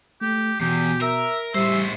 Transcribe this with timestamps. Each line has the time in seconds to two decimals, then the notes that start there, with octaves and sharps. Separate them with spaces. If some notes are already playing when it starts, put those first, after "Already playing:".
0.21 A3 G4
0.61 E2 B2 G4
1.02 A#4 E5
1.55 A2 G3 C5 E5